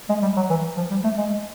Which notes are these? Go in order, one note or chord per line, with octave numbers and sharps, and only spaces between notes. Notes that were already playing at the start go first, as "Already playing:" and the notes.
G#3
G3
F#3
E3
F3
G3
A3
G#3